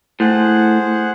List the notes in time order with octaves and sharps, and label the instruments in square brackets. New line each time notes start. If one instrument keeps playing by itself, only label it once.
[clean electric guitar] A2 [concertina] G#4 C5 F#5